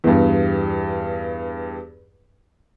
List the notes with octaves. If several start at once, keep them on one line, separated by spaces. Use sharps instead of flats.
E2 G2